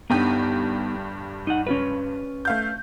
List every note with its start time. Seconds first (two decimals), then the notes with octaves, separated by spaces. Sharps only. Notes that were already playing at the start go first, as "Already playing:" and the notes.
0.10 G1 G2 B3 D#4 G4
1.47 D#4 F#5
1.67 C#4 F4 B4
2.45 A3 F5 G6